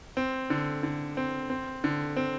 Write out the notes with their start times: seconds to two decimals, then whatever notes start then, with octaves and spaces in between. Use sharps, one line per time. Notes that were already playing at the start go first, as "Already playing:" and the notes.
0.17 C4
0.50 D3
0.83 D3
1.17 C4
1.50 C4
1.84 D3
2.17 C4